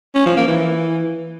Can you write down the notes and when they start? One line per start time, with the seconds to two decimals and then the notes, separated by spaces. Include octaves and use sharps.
0.15 C#4
0.26 F3
0.37 A#3
0.48 E3